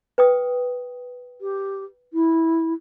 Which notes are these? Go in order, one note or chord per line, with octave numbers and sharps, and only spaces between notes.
B4 G5 D#6
G4
E4